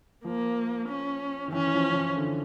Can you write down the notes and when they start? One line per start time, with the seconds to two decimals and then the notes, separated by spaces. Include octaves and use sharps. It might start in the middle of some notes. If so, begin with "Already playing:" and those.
0.25 F3 A#3
0.89 C#4
1.48 D#3
1.52 E3 C#4
1.67 E3
1.74 F3
1.89 F3
1.95 E3
2.17 D3